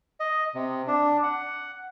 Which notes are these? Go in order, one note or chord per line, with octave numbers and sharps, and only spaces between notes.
D#5
C3
D4
F#5